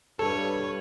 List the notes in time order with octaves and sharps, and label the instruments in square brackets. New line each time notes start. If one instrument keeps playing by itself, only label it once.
[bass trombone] G2 [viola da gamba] G3 B4 [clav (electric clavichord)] A4 [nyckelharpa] C#5